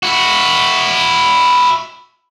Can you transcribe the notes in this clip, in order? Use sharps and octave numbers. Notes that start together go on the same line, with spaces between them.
E4 F#4